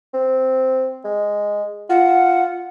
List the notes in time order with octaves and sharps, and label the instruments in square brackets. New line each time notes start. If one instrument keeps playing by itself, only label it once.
[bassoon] C4
G#3
[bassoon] F4 [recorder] F#5